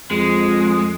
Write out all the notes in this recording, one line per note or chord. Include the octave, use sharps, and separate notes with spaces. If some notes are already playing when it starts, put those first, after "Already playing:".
F2 G#3